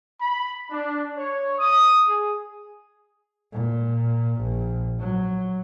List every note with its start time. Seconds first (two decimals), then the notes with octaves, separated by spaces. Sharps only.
0.20 B5
0.71 D4
1.18 C#5
1.59 D#6
2.08 G#4
3.53 A#2
4.42 A#1
5.01 F#3